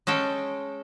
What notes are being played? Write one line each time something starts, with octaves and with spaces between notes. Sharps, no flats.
G#3 C#4 A4 G5